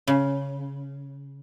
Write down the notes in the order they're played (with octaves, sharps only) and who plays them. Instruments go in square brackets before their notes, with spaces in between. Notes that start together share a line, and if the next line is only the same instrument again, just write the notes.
[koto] C#3